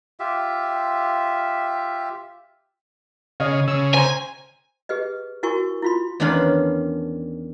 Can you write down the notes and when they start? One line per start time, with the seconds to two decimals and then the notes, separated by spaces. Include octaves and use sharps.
0.20 F4 G4 E5
3.40 C#3 D#5 F5
3.68 C#3 E6
3.94 C5 G#5 A#5
4.89 G4 G#4 B4 D#5
5.43 E4 F#4 A#4 G#5 C#6
5.82 E4 F4 C6
6.20 E2 D#3 C#4 D4 F4 B5